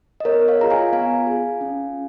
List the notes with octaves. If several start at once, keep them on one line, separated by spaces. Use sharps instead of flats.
D#5
B3 A#4 C#5
C#5 F5
F4 G#4 A#5
F5 G#5
B3 F5 G#5
F4 G#4
C#4